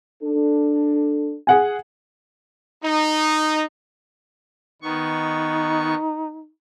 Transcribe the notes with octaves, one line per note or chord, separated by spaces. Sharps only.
D4 A4
G#4 F#5 G#5
D#4
D#3 B3 D#4 C#6